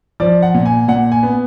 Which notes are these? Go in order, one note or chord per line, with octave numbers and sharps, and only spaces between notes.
F3 D5
F#5
A#2
G#5
A#2 F#5
G#5
B3